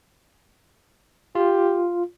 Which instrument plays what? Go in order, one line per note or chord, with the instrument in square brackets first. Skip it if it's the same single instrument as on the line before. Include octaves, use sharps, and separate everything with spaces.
[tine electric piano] F4 [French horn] G4